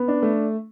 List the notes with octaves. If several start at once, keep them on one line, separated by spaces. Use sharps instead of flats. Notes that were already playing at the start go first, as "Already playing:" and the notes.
Already playing: B3
D4
A3